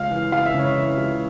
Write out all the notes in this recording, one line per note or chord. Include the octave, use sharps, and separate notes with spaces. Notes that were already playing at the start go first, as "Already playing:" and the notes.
Already playing: C#2 F5
E3
C#2 F5
E5
C#3
C#5
E3 E5
C#2